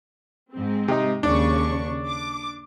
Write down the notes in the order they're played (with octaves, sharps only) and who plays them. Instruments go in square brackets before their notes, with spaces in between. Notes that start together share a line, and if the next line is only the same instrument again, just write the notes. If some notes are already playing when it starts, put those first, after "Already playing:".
[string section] G#2 C4
[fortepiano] C3 D#4
[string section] D#2 C#3 C#6 [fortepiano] D4
[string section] D6